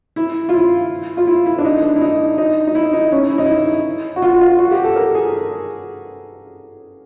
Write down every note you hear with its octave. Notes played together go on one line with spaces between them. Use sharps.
E4
F4
E4
F4
E4
E4
D4
D#4
D4
E4
D#4
D#4
D#4
E4
D#4
C#4
E4
D#4
E4
F#4
F4
F4
F#4
G4
A4
A#4
G#4